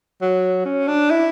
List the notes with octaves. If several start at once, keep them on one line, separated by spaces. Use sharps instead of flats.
F#3
C#4
D4
E4